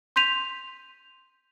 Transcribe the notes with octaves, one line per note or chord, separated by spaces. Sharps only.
C6 G6 B6 D#7 F7